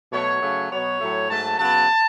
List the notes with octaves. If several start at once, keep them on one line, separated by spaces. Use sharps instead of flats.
B2 F#3 A3 C#5
C#3 F#3 A3
B2 F#3 B3 C#5
A2 F#3 A3
G#2 F#3 A3 A5
C#3 F#3 B3 A5